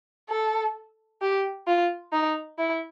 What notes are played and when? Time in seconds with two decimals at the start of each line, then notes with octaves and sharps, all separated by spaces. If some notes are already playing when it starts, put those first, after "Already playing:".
0.30 A4
1.22 G4
1.67 F4
2.13 D#4
2.59 E4